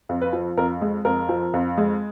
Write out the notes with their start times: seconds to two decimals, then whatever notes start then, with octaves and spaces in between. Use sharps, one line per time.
0.09 F2
0.21 B4
0.33 F3
0.57 F2 A#4
0.82 G#3
1.05 F2 A#4
1.29 F3
1.54 F2
1.78 G#3